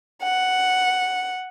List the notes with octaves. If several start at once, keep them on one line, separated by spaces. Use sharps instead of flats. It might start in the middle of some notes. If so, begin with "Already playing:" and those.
F#5